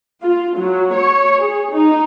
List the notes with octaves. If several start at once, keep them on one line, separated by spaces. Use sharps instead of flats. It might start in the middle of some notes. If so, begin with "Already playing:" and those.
F4
F#3
C#5
G#4
D#4